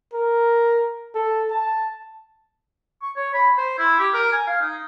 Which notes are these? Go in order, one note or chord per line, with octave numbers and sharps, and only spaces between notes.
A#4
A4
A5
C#6
C#5
B5
C5
E4
G4
A#4
G#5
F5
D#4